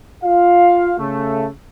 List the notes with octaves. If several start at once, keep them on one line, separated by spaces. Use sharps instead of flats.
F4 F5
C#3 A3